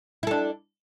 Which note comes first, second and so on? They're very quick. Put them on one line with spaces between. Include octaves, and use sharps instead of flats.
E4 A4 D4